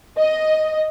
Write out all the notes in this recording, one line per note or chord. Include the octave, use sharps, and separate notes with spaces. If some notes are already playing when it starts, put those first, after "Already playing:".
D#5